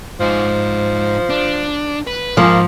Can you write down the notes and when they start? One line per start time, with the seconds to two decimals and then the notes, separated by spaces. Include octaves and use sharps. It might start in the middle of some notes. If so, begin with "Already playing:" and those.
0.20 G#2 F3 D#4
1.30 D4
2.07 B4
2.37 G#2 F3 A#3